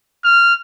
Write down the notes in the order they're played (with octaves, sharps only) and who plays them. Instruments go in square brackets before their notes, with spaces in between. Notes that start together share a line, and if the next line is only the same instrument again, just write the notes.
[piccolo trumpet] F6